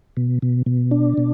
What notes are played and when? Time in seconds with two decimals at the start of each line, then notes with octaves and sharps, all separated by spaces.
0.17 B2
0.42 B2
0.66 B2
0.91 D4
1.18 B2